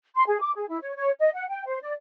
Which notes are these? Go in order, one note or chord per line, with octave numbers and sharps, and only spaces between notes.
C6
G#4
D6
G#4
E4
C#5
C#5
D#5
F#5
G5
C5
D5